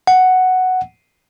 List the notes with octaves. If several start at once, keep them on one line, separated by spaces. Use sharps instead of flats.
F#5